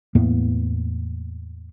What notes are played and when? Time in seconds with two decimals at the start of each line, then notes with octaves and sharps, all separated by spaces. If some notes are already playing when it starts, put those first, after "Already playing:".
0.15 E2 A2 A#3 B3